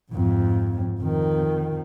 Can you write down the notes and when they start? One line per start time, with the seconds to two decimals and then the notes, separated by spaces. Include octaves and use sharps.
0.12 F2 G#2
1.00 F2 D#3